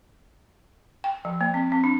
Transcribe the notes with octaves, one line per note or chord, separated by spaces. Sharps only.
G5
F3
A#3
C4
C4
D4